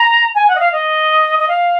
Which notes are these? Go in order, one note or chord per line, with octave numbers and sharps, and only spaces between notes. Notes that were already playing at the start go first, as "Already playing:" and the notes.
Already playing: A#5
G#5
F#5
D#5
F5
D#5
D#5
F5